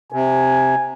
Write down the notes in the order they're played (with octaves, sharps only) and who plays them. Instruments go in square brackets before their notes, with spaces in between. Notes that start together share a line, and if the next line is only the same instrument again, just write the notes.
[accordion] C3 [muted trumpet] G#5